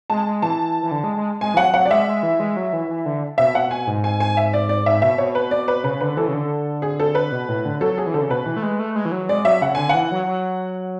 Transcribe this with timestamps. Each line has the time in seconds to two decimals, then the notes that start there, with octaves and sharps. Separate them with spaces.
0.10 G#3 A5
0.26 G#3
0.42 E3 A5
0.83 E3
0.91 D3
1.04 G#3
1.16 G#3
1.41 G#3 G#5
1.54 E3
1.57 F#3 F#5
1.74 F#3 F#5
1.85 D5
1.90 G#3 E5
2.07 G#3
2.23 E3
2.40 G#3
2.57 F#3
2.73 E3
2.89 E3
3.06 D3
3.38 B2 E5
3.55 F#5
3.71 G#5
3.87 G#2
4.04 G#5
4.20 G#5
4.37 E5
4.53 D5
4.69 D5
4.86 G#2 E5
5.02 B2 E5
5.18 B2 C#5
5.35 B4
5.51 D5
5.68 B4
5.84 C#3 B4
6.01 D3 B4
6.17 E3 A4
6.28 C#3
6.34 D3
6.82 G#4
7.00 A4
7.15 B4
7.32 B2
7.49 A2
7.65 D3
7.81 F#3 A4
7.98 G#4
8.07 E3
8.14 D3 A4
8.22 C#3
8.30 B2 B4
8.46 E3
8.56 A3
8.63 G#3
8.79 A3
8.96 G#3
9.05 E3
9.12 F#3
9.29 G#3 D5
9.45 F#3 E5
9.62 C#3 F#5
9.75 D3 G#5
9.89 E3 F#5
10.11 F#3
10.27 F#3